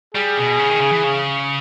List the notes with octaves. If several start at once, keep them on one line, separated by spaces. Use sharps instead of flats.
G3 G#4
B2
C#3
D#3
C#3
E3
C#3